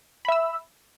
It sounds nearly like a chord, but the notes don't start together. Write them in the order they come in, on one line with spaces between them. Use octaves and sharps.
B5 E5 E6